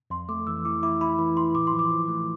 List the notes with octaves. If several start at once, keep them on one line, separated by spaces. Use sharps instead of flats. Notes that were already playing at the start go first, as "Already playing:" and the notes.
F2 C6
A3 D6
E3 E6
E4 D6
E4 D6
E4 B5
E3 B5
E3 C6
A2 D6
C6
F3
D6
F3
A3